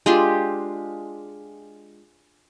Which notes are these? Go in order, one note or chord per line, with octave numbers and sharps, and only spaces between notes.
G#3 D4 F4 G4